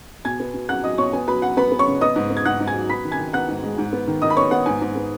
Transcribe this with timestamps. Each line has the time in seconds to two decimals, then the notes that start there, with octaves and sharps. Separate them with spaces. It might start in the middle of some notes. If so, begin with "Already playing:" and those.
0.25 B2 G#5 G#6
0.40 B3
0.54 B2
0.69 F#3 F#5 F#6
0.83 F#3 D#5 D#6
0.98 B2 C#5 C#6
1.13 B3 G#5
1.28 F#3 B4 B5
1.42 F#3 F#5
1.57 B3 B4 B5
1.72 B3
1.79 C#5 C#6
1.86 C#3
2.01 B3 D#5 D#6
2.16 G#2
2.30 B3
2.37 G#6
2.45 G#2 F#5 F#6
2.60 G#2
2.67 G#5 G#6
2.74 F#3
2.89 B3 B5 B6
3.04 D#3
3.11 G#5 G#6
3.19 D#3
3.33 B3 F#5 F#6
3.48 G#2
3.63 G#3
3.78 G#2
3.93 B3
4.07 D#3
4.22 D#3 D#5 D#6
4.30 B5
4.37 B3 C#5 C#6
4.51 B3 F#5
4.66 G#2 G#5
4.81 G#2
4.95 B3